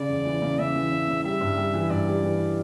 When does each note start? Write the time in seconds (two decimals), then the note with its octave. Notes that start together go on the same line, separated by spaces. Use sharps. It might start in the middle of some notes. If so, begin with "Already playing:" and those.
Already playing: C#3 D5
0.09 E1
0.25 E3
0.42 C#3
0.59 C#3 E5
0.75 E3
0.91 C#3
1.08 C#3
1.24 G3 E5
1.40 G2
1.57 G3
1.73 E3
1.90 G2 D5
2.07 G3
2.23 E3